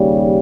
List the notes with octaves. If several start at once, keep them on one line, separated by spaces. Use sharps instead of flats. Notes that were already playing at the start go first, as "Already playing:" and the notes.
Already playing: D#2 C#3 G3